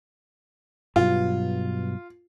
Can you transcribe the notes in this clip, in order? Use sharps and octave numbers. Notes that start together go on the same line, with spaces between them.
G2 B2 F#3 F4